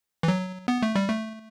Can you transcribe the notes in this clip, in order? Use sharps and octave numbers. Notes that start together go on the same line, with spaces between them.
E3
F#3
B3
A3
G3
A3